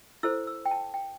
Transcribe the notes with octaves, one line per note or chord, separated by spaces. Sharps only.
E4 A4 C5 E6
E6
G5
A5
G5